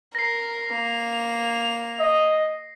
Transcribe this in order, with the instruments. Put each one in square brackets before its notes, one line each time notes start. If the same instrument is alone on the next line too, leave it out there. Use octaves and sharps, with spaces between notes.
[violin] A#4 [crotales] A#6 C7
[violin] A#3 F7
[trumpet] D#5